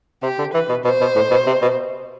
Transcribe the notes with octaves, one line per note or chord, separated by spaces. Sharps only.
C3 G4
D3
E3 B4
B2
B2 C5
B2
A2
B2
C3
B2